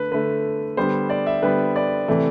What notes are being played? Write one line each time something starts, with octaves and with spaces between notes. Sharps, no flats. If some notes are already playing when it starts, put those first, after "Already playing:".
Already playing: D3 A3 B4
D3 A3 B4
D3 G3 B3 C5
D5
E5
D3 G3 B3 B4
D5
C3 E3 A3